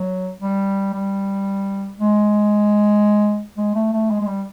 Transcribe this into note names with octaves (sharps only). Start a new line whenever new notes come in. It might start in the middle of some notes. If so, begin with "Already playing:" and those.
Already playing: F#3
G3
G3
G#3
G#3
A3
A3
G#3
G#3
G3